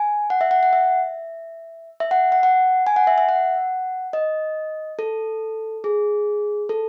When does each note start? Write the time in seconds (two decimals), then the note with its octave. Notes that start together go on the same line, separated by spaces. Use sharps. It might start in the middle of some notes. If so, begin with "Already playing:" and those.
Already playing: G#5
0.30 F#5
0.41 E5
0.51 F#5
0.63 F#5
0.73 E5
2.00 E5
2.11 F#5
2.32 F#5
2.43 F#5
2.87 G#5
2.96 F#5
3.07 E5
3.18 E5
3.29 F#5
4.13 D#5
4.99 A4
5.84 G#4
6.69 A4